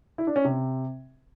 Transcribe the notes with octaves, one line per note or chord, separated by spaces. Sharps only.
E4
D4
C#4
C3